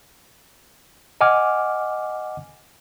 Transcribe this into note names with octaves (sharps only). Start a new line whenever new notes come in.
D#5 F#5 G#5 D6 F6